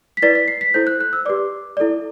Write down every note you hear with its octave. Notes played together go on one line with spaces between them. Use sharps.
B6
E4 B4 D5 A6
B6
C7
B6
E4 A4 C5 G6
F#6
F#6
E6
G4 B4 D5 D6
E4 A4 D5